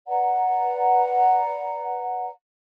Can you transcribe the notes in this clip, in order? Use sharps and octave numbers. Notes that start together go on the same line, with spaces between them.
B4 D5 F#5 A#5